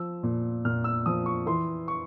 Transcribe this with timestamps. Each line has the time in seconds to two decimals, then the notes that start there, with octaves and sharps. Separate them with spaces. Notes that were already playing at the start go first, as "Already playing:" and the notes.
Already playing: F3 E6
0.23 A#2
0.65 A#2 F6
0.84 E6
1.06 F3 D#6
1.26 C#6
1.46 E3 C6
1.88 C#6